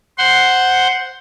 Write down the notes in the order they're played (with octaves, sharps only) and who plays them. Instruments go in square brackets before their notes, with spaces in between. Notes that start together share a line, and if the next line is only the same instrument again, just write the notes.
[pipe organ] C5 F#5 C6